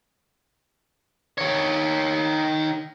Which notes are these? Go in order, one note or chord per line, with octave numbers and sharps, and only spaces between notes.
D#3 C#5